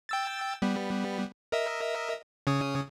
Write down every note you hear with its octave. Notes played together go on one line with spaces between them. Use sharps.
G5 E6 A6
G3 B3
A#4 D#5 E5
C#3 C#4 D#6